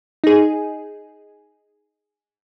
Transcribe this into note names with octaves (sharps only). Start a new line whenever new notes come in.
D#4 G#4